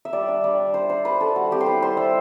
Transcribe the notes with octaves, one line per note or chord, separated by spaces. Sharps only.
E5
G3 D5
D4
G3 D5
D4
G3 C5
D4 C5
G3 B4
D4 A4
G3 F#4
C4 G4
C5
E4 B4
G3 C5
G3 E5